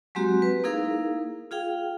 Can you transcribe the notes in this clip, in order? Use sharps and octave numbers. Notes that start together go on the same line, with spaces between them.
F#3 G#3 A#3 C4 F#4 G4
B4
A#3 D#4 E4 G#4 A#4 F5
F4 G#4 F5 G5